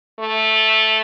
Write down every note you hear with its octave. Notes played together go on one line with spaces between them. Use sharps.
A3